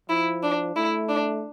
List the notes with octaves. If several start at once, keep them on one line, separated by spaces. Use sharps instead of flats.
F3 E4
D4
A3 E4
D4